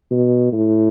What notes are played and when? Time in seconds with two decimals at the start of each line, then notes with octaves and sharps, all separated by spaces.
0.11 B2
0.52 A2